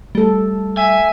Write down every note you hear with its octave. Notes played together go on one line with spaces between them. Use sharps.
G3 A3 A4
E5 G#5